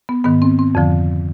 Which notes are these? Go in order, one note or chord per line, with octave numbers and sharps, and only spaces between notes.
B3
G#2 D#3 B3
C4
C4
F2 D3 F3